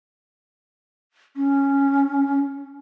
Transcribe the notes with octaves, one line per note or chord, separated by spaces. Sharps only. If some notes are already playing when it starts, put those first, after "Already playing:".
C#4